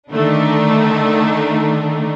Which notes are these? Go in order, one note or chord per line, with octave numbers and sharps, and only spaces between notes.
D3 D#3 A3 D4 D#4